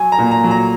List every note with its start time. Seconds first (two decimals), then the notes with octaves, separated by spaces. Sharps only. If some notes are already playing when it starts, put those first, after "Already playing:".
Already playing: F#3 G#5
0.12 A#5
0.18 A#2
0.31 A#5
0.44 F#3
0.51 A#5